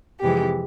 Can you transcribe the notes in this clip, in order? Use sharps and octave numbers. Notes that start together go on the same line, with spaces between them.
F2 C3 E3 G#3 G4